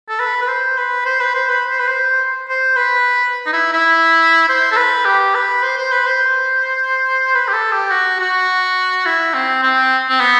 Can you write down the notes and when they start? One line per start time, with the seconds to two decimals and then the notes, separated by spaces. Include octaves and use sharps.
0.09 A4
0.19 B4
0.42 B4
0.48 C5
0.77 B4
1.05 C5
1.20 B4
1.35 C5
1.49 B4
1.70 C5
1.80 B4
1.87 C5
2.49 C5
2.76 B4
3.46 D#4
3.53 E4
3.73 E4
4.49 C5
4.72 A4
4.76 B4
5.05 G4
5.35 B4
5.63 C5
5.77 C5
5.92 B4
6.06 C5
7.35 B4
7.48 G4
7.53 A4
7.72 G4
7.91 F#4
8.20 F#4
9.06 E4
9.34 C4
9.63 C4
10.09 C4
10.20 B3